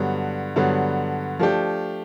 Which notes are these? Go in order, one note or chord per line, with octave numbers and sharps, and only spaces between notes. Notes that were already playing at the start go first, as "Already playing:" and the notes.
Already playing: G2 D3 F#3 B3
G2 D3 F#3 B3
F3 A3 D4 G4